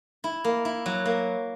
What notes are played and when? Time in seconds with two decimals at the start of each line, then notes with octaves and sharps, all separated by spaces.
0.24 E4
0.44 A#3
0.65 E4
0.86 F#3
1.06 A#3